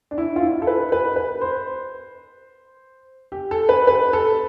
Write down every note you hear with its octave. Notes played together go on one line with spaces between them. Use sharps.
D4
E4
F4
E4
A4
B4
B4
B4
C5
G4
A4
B4
B4
A4